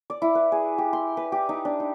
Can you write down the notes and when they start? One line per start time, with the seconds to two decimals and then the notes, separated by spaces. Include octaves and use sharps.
0.10 D5
0.22 E4
0.35 B4
0.52 G#4
0.78 G4
0.93 C6
1.17 B4
1.32 G4
1.49 D#4
1.65 D4
1.80 D#4